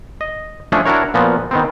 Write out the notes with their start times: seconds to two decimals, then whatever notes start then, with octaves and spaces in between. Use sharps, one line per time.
0.21 D#5
0.72 F3 G#3 A3 C#4 D4 G#4
0.85 D4 E4 F#4 A#4 C#5
1.14 A#2 F3 B3 F#4
1.51 D#3 B3 C4